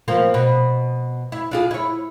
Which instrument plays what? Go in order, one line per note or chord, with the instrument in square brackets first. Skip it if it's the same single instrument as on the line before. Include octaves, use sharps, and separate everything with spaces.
[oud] F3 A#3 C4
B2
E4
D4 F4 G#4
E4 C#5